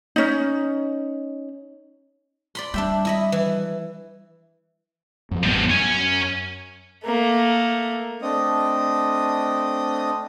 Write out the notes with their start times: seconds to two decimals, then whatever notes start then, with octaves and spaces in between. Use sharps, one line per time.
0.16 C#4 D#4
2.55 D5 B5 C6
2.74 G3 D4 E5 G5
3.05 E4 D#5 B5
3.32 E3
5.31 F#2 F3
5.43 A1 A2 G3 A3 B3
5.70 F#2 C#4 G#5
7.04 A3 A#3
8.22 A3 C4 D4 D#5 D#6